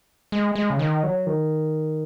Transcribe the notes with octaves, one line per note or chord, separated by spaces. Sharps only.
G#3
G#3
C#3
D#3
F#3
D#3